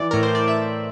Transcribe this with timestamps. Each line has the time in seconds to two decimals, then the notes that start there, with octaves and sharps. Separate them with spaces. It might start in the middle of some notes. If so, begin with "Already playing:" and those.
Already playing: E3 D5
0.11 A2 A#4
0.23 C5
0.35 D5
0.47 A2 E5